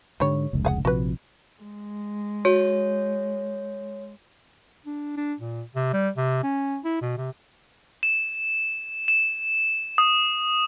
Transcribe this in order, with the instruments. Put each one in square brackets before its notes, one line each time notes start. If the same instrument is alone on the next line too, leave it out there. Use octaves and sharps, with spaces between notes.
[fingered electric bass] G#2 D3 [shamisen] G3 C#5
[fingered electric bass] F1 C#2
[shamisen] G#4 F5 F#5
[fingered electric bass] A#1 C3 F3 [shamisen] F#4 B4
[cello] G#3
[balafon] F#4 [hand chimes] C#5
[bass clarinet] D4
D4
A#2
C3
G3
C3
C#4
E4
B2
C3
[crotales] E7
E7
D#6